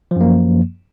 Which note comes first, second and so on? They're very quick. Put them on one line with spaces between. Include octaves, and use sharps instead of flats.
F3 F#2 A#3